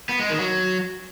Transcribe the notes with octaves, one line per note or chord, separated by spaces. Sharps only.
B3
G#3
D#3
F#3